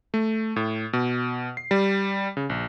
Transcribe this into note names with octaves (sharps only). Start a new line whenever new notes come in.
A3
A2
B2
C7
G3
C#3
A#1